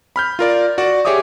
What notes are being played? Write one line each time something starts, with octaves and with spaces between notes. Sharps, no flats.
B5 F6 G6
F4 A#4 D5
F#4 D5
G4 G#4 C#5 E5 D6 D#6